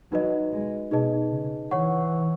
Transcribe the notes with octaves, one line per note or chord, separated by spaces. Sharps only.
F#3 D#4 F#4 B4 D#5
G#3
B2 D#4 G#4 B4 D#5 A5
C#3
E3 C#5 F#5 C#6